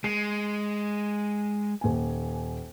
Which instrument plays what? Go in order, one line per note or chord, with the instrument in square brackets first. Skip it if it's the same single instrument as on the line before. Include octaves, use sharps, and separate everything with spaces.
[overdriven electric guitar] G#3 [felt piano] C7
[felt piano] D#1 G#5